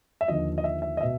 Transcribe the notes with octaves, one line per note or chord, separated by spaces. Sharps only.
E5
D#2 D3 F3 D#5
D#5
E5
E5
D#5
B2 E5